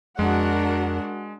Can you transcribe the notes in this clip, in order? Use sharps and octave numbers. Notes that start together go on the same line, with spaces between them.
F2 G#3 D4 F#4 A#4 F#5